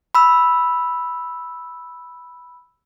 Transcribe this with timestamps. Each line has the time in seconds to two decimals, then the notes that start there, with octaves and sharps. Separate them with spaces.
0.15 B5 E6